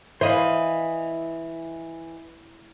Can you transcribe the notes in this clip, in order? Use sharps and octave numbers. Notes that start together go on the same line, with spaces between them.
E3 C5 D#5 F5